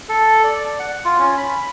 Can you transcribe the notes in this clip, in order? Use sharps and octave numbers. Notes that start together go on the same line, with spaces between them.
A4
D5
F#5
F4
C#4
B5